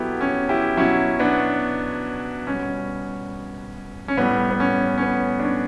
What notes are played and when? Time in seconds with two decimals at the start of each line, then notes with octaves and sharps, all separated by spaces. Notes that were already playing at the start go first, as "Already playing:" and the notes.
Already playing: B2 F#3 B3 E4 F#4 G4 A4
0.21 C#4
0.49 E4 G4
0.77 B2 F#3 C#4 E4
1.20 B3 D4
2.47 B2 G3 C#4
4.08 C#4
4.17 A2 G3 B3
4.51 B3
4.60 C#4
4.98 C#4
5.02 B3
5.39 D4
5.45 C#4